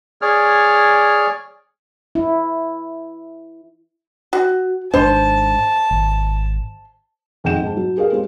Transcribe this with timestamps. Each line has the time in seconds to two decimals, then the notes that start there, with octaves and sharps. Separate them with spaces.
0.22 G#4 C#5 D5 F6
2.15 E4
4.33 F#4
4.94 G#1 G#2 D4 C5 A5 C6
5.91 G#1
7.44 G#1 F2 G#3 F#5 G6 E7
7.62 G#2 A5
7.77 F#3
7.97 G4 G#4 A#4 F5
8.12 G#3 C4 F4 G4